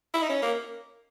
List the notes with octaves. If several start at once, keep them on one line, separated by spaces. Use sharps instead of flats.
E4
D#4
C#4
A#3